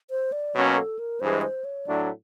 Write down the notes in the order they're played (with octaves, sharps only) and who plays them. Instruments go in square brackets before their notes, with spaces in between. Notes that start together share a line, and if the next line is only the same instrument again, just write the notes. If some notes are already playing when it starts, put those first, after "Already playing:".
[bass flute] C5
D5
[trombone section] B2 F#3 A#3 C#4 [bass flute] C#5
[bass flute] A4
A#4
[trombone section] G2 E3 G#3 [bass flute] C5
[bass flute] C5
C#5
[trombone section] A2 F#3 A3 D4 [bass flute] D5